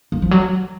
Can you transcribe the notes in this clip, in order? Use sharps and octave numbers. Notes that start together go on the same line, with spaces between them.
A#3
F3
F#3